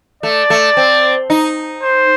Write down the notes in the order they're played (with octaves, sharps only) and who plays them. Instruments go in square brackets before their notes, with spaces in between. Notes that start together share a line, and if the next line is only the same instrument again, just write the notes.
[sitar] A3 [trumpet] D5
[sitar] A3
C4
D#4
[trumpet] C5